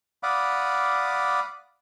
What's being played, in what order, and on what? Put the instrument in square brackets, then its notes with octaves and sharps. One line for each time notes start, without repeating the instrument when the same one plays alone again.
[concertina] D5 F5 F#5 B5 D6 D#6